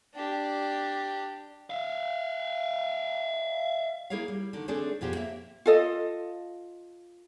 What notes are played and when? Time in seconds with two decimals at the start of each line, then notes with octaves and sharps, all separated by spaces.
0.15 D4 G4
1.70 E5 F5
4.10 A#3 E4 G#4 A#4 C#5 F5
4.28 G3
4.53 D3 D#3
4.68 A3 C4 D4 G#4 A4 D5
5.01 F2 B2 F4 G4 G#4 C5
5.15 A#3 E5
5.66 F4 A4 D#5